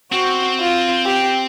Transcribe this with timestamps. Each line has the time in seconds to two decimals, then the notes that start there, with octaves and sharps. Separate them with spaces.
0.12 C4 F#4
0.58 F4
1.04 G4